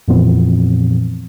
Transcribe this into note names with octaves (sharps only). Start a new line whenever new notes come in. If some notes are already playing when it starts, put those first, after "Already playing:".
F2 A#2 E3 F3 B3 C4